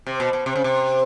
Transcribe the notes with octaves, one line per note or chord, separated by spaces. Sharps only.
C3
B2
B2
C3
C#3
C3